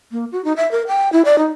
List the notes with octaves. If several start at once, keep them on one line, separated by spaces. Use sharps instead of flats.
A#3
F#4
D#4
E5
A#4
G5
E4
D5
D#4